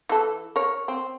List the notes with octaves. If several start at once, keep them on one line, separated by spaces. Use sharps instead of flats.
E3 A4
A#4 C#5
C4